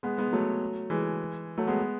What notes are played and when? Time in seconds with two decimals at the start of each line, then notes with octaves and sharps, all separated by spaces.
0.03 G#3 B3
0.18 G#3 B3
0.33 F#3 A3
0.90 E3 G#3
1.58 F#3 A3
1.67 G#3 B3